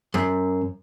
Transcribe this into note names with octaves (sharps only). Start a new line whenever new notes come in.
F#2